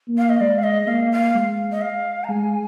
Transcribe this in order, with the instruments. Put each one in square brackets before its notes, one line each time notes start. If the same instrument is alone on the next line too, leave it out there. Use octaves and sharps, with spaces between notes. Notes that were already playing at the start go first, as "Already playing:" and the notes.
[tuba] A#3
[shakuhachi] F5
D#5
[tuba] G#3 [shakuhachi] D5
[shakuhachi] F5
D#5
[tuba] A#3 [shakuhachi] F5
[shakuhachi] F5
[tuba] G#3
[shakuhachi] D#5
F5
A#5
[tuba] G#3 [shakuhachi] G#5